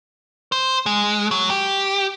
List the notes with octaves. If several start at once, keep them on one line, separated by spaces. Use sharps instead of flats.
C5
G#3
F#3
G4